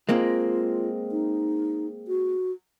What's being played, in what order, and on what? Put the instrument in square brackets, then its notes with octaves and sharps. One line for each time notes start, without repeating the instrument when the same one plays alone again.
[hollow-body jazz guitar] G#3 A#3 C4 [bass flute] F4
[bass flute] D#4
F#4